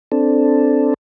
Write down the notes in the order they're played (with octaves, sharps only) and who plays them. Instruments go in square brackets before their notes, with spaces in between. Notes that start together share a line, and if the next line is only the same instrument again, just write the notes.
[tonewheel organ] C4 D4 A4